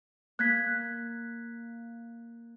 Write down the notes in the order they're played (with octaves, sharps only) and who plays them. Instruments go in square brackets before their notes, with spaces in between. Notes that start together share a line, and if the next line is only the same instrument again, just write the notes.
[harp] A#3 [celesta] F#6 G#6 B6